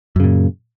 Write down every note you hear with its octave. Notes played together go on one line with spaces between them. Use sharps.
F#2 A#2 C#3